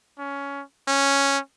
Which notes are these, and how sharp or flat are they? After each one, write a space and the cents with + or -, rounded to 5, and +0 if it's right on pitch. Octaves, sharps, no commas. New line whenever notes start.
C#4 +15
C#4 -5